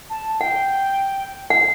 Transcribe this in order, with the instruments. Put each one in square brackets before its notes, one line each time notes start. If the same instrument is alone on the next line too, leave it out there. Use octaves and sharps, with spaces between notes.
[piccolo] A5
[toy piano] F#5 [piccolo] G5
[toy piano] F#5